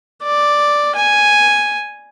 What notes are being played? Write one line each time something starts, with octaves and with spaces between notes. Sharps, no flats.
D5
G#5